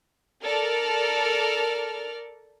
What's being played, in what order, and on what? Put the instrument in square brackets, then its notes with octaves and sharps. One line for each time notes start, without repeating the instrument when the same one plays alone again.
[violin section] A4 A#4 D5 F6